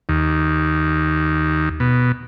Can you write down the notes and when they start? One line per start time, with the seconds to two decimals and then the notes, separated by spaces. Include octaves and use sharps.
0.09 D#2
1.80 B2